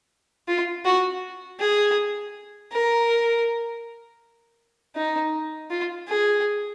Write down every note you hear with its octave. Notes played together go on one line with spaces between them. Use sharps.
F4
F#4
G#4
A#4
D#4
F4
G#4